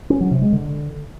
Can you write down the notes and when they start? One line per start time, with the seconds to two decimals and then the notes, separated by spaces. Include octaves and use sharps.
0.10 C#4
0.21 F#3
0.31 C3
0.42 G#3
0.52 D3